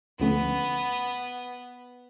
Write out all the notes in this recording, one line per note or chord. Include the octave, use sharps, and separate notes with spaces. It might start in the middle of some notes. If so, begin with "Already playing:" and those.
D2 D3 F3 A3 B3 C#4